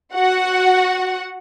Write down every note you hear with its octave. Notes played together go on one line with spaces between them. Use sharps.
F#4 F#5